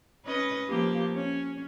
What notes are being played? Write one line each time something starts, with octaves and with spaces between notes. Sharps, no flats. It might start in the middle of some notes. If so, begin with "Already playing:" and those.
C#4 B4 D#5
F3 A#3 G4
C#4